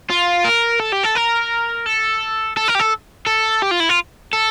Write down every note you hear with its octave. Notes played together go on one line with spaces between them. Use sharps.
F4
A#4
A4
G4
A4
A#4
A4
A4
A#4
G4
A4
A4
G4
F4
E4
F4
A4